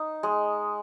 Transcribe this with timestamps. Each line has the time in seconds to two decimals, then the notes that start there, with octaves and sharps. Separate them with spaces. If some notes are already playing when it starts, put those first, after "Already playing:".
Already playing: D#4
0.23 G#3